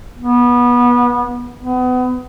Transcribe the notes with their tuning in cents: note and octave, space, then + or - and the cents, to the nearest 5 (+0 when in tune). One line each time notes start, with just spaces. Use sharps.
B3 -25
B3 +30